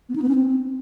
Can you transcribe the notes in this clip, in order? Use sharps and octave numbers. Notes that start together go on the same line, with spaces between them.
B3
D#4
B3
C#4
C4